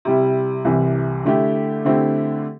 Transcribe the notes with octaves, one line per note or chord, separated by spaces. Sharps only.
C3 G3 E4
C2 C3 E3
D3 A3 E4 G4
D3 A3 C4 E4 G4